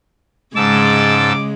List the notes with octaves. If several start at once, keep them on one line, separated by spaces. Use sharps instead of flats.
G#2 C#3 G#3 A5 D6 E6